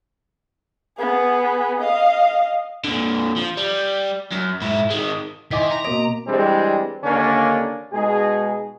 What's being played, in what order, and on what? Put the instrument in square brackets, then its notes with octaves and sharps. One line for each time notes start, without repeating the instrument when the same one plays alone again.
[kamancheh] B3 G#4
D#5 F5
[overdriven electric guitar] A#2 D3
F3
G3
F#2
G#2 E4
D#3 G#3
[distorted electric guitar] D#3 [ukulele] E4 D#5 G#5 [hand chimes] C6 D6 B6
[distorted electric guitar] A#5
[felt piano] B2 A#3 D7 [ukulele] D#5
[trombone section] E3 G3 G#3 C4 D4
D#2 D3 A#3 C#4 D4
B2 G#3 D#4 G#4